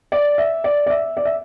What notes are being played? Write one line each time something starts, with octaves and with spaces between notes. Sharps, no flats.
D5
E5
D5
D5
E5
D5
E5